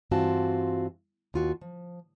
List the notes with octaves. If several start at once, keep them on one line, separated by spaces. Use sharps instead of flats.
G2 E3 C4 F4 F#4 A5
D#2 F4 F#4
F3